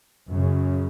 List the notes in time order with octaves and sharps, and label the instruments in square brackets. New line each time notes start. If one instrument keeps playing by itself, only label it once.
[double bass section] F#2 C#3